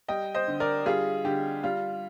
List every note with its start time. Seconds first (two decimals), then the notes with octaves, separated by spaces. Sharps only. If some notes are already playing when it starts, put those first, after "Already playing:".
0.08 G3 D#5 G5
0.35 C5 D#5
0.48 D3
0.60 A#4 D5
0.86 G3 F4 G#4
1.24 D3 G4
1.63 G3 F4